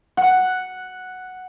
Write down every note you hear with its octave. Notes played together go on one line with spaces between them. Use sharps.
F#5